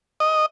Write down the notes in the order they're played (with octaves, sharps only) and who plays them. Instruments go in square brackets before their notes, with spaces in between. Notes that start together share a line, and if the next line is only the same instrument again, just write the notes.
[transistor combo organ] D#5